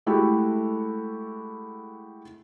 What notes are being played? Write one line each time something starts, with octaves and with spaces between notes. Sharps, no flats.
G#3 A3 E4 F#4 G4 A4